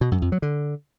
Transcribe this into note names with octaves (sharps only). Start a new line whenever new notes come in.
B2
F#2
F2
F#3
D3